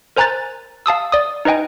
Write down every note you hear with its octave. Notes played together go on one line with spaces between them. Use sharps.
A#4 C5 G#5 A#5 F#6 A6
F5 A5 D#6 E6
D5 D#6
D#4 B4 D#5 G5 G#5